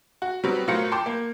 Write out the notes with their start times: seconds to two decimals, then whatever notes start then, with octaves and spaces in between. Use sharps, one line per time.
0.22 F#4
0.44 F#3 G3 B3 C4
0.67 A2 F#3 F4 A#4 C5 C#7
0.92 G5 A5 C6 D6 G6
1.06 A#3